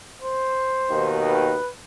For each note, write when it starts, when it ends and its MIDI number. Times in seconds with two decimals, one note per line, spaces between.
0.22 1.14 72
0.90 1.57 39
0.90 1.57 47
0.90 1.57 51
1.29 1.69 71